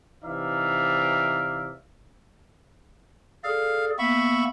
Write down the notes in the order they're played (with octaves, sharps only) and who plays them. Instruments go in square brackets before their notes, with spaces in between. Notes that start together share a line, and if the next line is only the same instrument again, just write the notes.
[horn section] C3 E3 D#4 D5 E5 F5
[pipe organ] G#4 A4 D5 [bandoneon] F5
[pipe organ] A#3 B3 [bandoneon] E5 B5 C#6